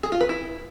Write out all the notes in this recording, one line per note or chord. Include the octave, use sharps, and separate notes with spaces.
G#4
F4
B4
E4